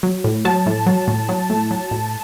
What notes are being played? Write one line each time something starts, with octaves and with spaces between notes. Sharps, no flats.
F#3
A2
F#3 A5
A2
F#3
A2
F#3
A2
F#3
A2